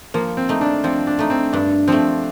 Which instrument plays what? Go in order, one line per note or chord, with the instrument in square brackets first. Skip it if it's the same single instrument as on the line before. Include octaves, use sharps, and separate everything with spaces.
[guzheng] F3 [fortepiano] A#3
[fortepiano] C4
[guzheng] A3 D#4
[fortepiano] D4
[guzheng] F3 [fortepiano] C4
[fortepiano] D4
[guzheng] A3 D#4
[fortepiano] C4
[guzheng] G2 [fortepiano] D4
[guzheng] F3 A3 [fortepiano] C4